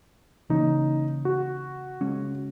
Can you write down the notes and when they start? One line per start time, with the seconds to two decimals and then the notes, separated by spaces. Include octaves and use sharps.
0.50 C#3 E3 A#3 C#4 D#4
1.25 F#4
2.01 C#3 G#3 C#4